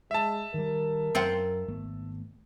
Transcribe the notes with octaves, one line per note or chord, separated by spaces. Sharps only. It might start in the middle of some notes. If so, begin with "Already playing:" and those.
G#3 E5 A5
D#3 G3 A#4
F#2 C4 F4 F#5
G#1 A3 B3